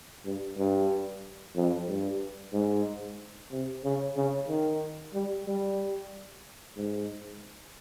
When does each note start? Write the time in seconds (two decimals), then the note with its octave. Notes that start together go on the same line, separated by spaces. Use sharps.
0.25 G2
0.58 G2
1.56 F2
1.88 G2
2.53 G#2
3.51 C3
3.84 C#3
4.16 C#3
4.49 D#3
5.14 G3
5.46 G3
6.77 G#2